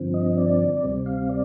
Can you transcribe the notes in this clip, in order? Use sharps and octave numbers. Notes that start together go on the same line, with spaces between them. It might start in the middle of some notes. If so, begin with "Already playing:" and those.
Already playing: G2 D3 F3 C4
D#5
D5
D2 C3 G3 C4
F5
D5